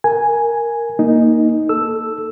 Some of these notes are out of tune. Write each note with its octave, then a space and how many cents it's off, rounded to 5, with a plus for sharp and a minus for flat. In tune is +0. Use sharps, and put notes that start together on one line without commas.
A#4 +0 G#5 +0
A#3 +0 D#4 +0
A4 +0 E6 +0